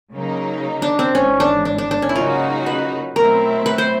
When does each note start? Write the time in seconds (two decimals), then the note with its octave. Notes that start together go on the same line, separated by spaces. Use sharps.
0.15 C#3 F#3 A#3 D#4
0.82 D4
0.99 C4
1.15 G#1 G#2 E3 C#4
1.40 D4
1.65 D4
1.78 D4
1.91 D4
2.02 C#4
2.09 E4
2.16 C#3 F#3 A#3 D#4 F4 F#4
2.66 B4
3.16 B2 F#3 A3 C4 E4 A#4
3.66 B4
3.78 C5